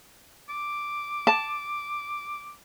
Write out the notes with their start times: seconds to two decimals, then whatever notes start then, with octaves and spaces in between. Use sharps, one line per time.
0.49 D6
1.27 A5